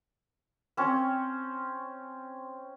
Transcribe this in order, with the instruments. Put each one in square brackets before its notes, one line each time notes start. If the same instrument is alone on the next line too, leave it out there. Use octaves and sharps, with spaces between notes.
[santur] C4 C#4